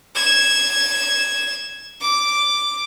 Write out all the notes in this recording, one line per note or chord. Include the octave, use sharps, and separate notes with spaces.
G#6 E7
D6